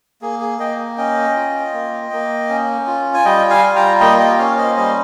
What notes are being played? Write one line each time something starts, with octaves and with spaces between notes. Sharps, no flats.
A#3 G#4
G#4
A#3 D#5 G5
C#4 D#5 G5
F4
A#3
A#3
C#4
F4
G#5
G3 D#5 G5
F5 G#5
F4
G5 A#5
A#3 D#5 G5
D#5 G5
C#4 C#5 F5
C5 D#5
G3 C5 D#5